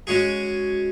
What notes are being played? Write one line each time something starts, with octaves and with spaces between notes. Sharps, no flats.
G#3 C#4 F#4 G#4